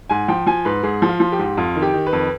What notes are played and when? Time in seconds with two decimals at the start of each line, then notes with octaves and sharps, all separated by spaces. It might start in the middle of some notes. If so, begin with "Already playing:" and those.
0.09 G#2 G#5
0.28 F3 G5
0.46 F3 G#5
0.65 G#2 B4
0.83 G#2 G#4
1.02 F3
1.09 F4
1.20 F3
1.32 G4
1.39 G#2
1.57 F2 F4
1.76 D#3
1.82 G4
1.94 D#3
2.06 B4
2.13 F2